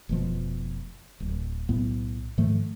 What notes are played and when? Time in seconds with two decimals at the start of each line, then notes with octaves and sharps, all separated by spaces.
0.09 F1 B2 F3
1.20 D1
1.69 B1 A2 B3
2.38 G#2 D#3 F3 A3